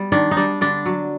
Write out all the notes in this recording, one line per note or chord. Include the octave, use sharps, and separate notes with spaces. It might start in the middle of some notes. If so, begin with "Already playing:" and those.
Already playing: G3 B3
D#3 D4
D#4
G3 D4
D3 D4
F#3